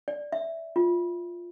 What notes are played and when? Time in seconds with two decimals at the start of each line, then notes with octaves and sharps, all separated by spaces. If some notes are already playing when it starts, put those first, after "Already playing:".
0.08 D5
0.32 E5
0.76 F4